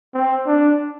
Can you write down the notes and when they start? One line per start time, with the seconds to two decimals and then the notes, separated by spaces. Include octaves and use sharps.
0.14 C4
0.46 D4